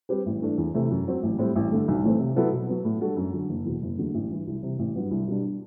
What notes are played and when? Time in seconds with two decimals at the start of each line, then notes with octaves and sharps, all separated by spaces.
0.09 G3 C4 G4 B4
0.26 A1
0.42 G2 E3 A3 D4
0.58 E2
0.74 C3 E3 A3 E4
0.91 F#2
1.07 F#3 C4
1.23 A1
1.38 A2 G3 C4
1.56 A1
1.71 G2 D3 A3
1.88 B1
2.03 A2 E3 A3 C4
2.20 C3
2.36 F#3 B3 E4 A4
2.52 B2
2.69 F#3 B3
2.85 A2
3.00 G3 D4 F#4 A4
3.17 F#2
3.33 D3 F#3
3.49 F#1
3.65 E2 B2
3.82 F#1
3.97 E2 D3 F#3 A3
4.15 A1
4.30 G2 E3 G3
4.47 C2
4.63 C3 E3
4.79 A1
4.96 G2 F#3 B3
5.11 C2
5.27 B2 G3 D4